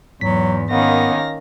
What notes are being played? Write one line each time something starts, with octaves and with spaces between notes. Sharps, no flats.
E2 G#2 F#3 B6
D#3 A#3 B3 C#4 F5 A#6